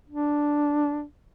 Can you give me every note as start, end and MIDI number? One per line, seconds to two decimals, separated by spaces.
0.10 1.04 62